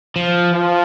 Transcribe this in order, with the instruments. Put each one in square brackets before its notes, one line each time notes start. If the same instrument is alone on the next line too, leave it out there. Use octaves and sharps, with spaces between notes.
[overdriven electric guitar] F3
[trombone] F3